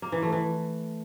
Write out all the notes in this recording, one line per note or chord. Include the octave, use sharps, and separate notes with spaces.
A#3
E3
A3
E3